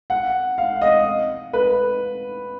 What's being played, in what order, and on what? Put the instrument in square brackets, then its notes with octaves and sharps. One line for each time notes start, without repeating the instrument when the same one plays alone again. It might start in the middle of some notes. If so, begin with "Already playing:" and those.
[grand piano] F#5
F5
D#5
B4